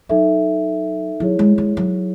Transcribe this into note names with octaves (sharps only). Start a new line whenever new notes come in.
F#3 D#4 A4 E5
F#3 E4 G#4 C#5
G#3
G#3
F#3